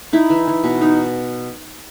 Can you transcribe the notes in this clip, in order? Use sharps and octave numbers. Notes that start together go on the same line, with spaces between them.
D#4 E4
E3
E3
B2
D#4